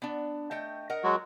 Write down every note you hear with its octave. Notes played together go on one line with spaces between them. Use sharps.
B3 D4
A3 D#5 G5
A#4 D#5 F#5
F#3 G#3 F#4